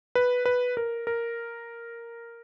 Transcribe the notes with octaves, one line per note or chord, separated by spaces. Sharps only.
B4
B4
A#4
A#4